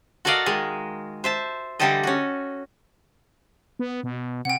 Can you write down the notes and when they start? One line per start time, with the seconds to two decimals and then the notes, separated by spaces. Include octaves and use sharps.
0.25 F#4 A4 A#4 D5 D#5 F5
0.46 D#3 G#3
1.24 C5 E5 A5
1.79 D3 E3 G3 G4 A4 D#5
2.03 C#4 F#4
3.79 B3
4.03 B2
4.45 C3 F#5 G5